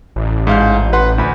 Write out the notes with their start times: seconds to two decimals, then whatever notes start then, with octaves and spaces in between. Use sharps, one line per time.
0.16 A1
0.47 G#2 F5 G6
0.93 B4 F#5 C6
1.18 D2 B5